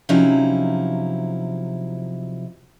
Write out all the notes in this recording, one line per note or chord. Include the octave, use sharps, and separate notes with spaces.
C3 F3 F#3 C#4 D#4 E4